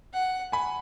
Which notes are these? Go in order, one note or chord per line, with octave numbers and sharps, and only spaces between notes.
F#5
G#5 B5